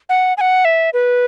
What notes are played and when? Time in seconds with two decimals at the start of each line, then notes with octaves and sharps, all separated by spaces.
0.09 F#5
0.37 G#5
0.41 F#5
0.65 E5
0.93 B4